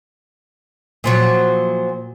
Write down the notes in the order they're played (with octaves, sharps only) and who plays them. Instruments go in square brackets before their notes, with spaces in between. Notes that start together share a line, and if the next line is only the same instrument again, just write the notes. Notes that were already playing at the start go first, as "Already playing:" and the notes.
[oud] A#2 F3 F#3